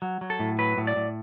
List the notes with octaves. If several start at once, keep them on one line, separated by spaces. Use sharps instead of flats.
F#3
F#3
A4
A2
F#3 B4
A2
D5
A2